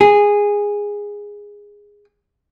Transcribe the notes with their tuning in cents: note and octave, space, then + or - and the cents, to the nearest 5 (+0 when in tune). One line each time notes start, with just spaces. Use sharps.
G#4 -10